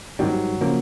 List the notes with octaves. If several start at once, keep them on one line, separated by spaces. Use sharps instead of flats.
G#2 D#3 F#3 G3
C#3 F3 A#3